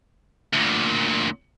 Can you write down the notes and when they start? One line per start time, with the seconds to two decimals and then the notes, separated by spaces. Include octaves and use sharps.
0.53 D2 A#2